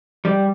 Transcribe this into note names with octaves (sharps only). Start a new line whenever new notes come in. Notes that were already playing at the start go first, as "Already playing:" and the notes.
G3